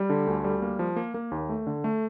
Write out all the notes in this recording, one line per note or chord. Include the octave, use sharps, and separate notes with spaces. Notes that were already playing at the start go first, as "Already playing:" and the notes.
Already playing: G3
D3
D2
G3
A#3
F3
A#3
A#3
D#2
A3
D3
A3